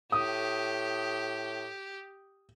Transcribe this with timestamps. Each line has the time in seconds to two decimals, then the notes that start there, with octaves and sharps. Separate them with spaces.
0.12 A2 G4 D#6